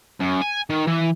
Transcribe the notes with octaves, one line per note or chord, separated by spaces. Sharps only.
F#2
G#5
D#3
E3